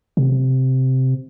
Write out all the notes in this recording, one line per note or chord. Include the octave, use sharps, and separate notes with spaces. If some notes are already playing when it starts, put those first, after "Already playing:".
C3